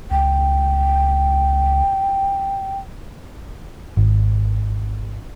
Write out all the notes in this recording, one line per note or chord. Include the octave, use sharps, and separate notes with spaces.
C#2 G5
G#1